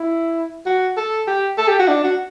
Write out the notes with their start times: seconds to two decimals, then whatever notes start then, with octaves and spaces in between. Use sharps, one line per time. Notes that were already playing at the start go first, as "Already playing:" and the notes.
Already playing: E4
0.66 F#4
0.97 A4
1.27 G4
1.58 A4
1.68 G4
1.79 F#4
1.88 D4
2.04 F#4